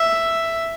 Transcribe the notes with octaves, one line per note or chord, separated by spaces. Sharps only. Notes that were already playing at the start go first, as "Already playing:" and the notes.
Already playing: E5